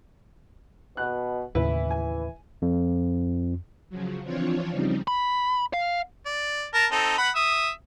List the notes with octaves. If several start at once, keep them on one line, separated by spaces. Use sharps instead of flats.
B2 F#6
D#2 A2 C#3 E3 E4 B4
G#5
F2
C#3 F3 F#3
E3 F3 C4 D4 F4 C#5
C#3 F3 G3 C4 D#4
B5
F5
D5
A#4 A5 A#5
C4 D#4 A4
F#5 B5
E5 D#6